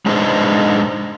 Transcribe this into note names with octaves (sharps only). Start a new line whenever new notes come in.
G#3 D4 D#4 B4 C5 D#5